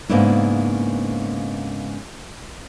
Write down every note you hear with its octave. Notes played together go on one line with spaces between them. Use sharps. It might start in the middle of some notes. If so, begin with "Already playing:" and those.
G#2 C#3 A#3 B3 D4 E4